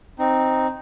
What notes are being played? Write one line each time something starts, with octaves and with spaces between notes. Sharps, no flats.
C4 D#4